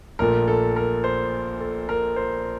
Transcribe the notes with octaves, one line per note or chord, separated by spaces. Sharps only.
A#1 A#2 A3 A#4
A4
A#4
C5
A4
A#4
C5